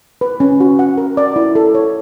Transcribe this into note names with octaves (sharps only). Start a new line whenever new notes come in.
B4
C#4
F#4
F#5
A#4
D5
E4
A4
C#5